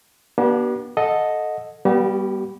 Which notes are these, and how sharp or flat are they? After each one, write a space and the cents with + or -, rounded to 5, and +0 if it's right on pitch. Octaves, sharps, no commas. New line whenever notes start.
B3 -40 D4 +0 G4 -45
A4 +0 D#5 +0 F#5 -25
G3 +10 B3 -30 G4 -40